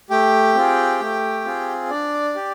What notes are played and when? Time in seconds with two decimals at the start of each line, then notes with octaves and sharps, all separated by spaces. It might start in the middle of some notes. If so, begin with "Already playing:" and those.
0.10 A3 G4 G5
0.55 C4 F4 G#4
1.00 A3
1.45 C4 F4 G#4
1.90 D4 D5
2.36 G4